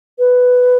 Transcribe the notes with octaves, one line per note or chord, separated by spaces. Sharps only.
B4